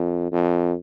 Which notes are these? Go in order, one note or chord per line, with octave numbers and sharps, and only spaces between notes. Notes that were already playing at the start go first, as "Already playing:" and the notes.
Already playing: F2
F2